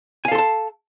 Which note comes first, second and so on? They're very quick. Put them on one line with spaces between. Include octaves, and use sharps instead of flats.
G#5 F5 A4 C6 A5